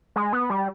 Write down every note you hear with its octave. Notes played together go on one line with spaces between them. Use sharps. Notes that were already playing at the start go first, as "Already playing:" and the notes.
G#3
B3
G3